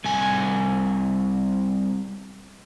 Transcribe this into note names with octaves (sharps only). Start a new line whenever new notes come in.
C2 G#5